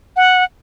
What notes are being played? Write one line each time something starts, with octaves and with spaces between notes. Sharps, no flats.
F#5